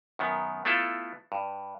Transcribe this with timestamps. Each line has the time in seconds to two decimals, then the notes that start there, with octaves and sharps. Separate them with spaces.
0.19 F#2 D#3 B3
0.65 A3 B3 E4 F4 A4
1.32 G2